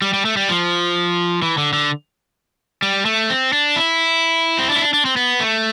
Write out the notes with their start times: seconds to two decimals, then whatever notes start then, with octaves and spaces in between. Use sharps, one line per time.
0.02 G3
0.13 G3
0.25 A3
0.37 G3
0.49 F3
1.42 E3
1.58 D3
1.73 D3
2.82 G3
3.05 A3
3.29 C4
3.53 D4
3.76 E4
4.59 C4
4.70 D4
4.76 E4
4.82 D4
4.93 D4
5.05 C4
5.17 B3
5.40 A3